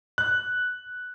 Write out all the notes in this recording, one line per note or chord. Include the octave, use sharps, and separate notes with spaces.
F#6